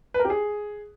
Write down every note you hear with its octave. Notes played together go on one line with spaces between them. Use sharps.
B4
A#4
G4
G#4